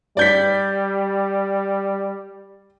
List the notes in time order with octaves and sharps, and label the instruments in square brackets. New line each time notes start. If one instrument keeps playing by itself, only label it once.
[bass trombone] G3 [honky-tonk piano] D5 G6 B6